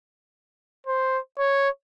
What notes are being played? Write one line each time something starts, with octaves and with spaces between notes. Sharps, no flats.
C5
C#5